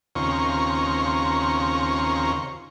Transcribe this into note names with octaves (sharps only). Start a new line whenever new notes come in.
D#2 C#3 C4 F4 A#5 C#6